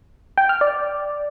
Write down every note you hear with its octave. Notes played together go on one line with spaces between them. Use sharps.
G5
F6
D5